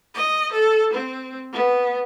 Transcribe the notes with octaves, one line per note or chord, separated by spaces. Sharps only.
D#5
A4
C4
B3